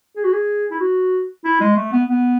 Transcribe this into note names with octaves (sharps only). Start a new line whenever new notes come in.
G#4
F#4
G#4
E4
F#4
E4
G#3
A3
B3
B3